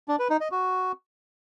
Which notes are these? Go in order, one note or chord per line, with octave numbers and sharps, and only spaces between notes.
D4
B4
D#4
D#5
F#4